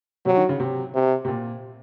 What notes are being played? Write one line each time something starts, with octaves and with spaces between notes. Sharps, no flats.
C3 F#3
D#3
C#3
C3
C3
C3
A#2